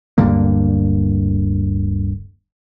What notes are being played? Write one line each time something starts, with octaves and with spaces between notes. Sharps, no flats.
D1 G2 D3 A#3